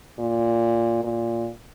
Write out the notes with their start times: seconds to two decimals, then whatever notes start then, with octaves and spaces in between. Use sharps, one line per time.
0.19 A#2
1.04 A#2